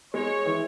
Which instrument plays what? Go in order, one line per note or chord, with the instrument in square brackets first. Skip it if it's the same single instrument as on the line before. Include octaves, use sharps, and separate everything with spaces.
[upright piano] G#3 [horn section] C#5
[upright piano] E3